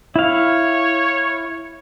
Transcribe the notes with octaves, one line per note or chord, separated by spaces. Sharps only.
E4 C#5 F5